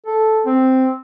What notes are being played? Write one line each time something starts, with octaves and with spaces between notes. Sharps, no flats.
A4
C4